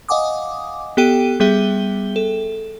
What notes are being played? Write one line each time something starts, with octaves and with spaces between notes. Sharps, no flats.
D#5 F5 F#5 G#5 D6 D#6
B3 G4 A4 G5 D#7
G3 B3 G#4 E5 G5 G7
A4